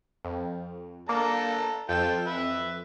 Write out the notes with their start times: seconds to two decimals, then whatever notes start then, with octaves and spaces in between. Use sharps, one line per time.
0.25 F2
1.09 A#3 D4 A4 A#5
1.89 F2 F4 A4 G5 E7
2.26 B4 E5